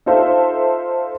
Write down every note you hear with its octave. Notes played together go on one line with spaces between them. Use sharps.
D#4 F4 A4 C5 E5 F5